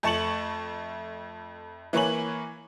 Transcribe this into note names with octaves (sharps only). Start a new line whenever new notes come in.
F2 A3 A5 C#6 C#7 F#7
E3 A#3 B4 C#5 G#5 F#7